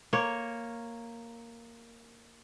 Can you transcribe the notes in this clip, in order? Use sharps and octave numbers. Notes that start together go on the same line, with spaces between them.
A#3 C#5